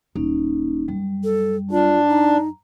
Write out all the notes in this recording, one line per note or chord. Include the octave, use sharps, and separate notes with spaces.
D#1 A#3 C#4 D#4
F#2 G3
A4
D4 F4
D#4 A#5